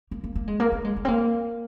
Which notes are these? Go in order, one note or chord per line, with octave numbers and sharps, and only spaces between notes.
A#3
A#3
A#3
G#3
A#3
A#3
G#3
A#3
C4
A#3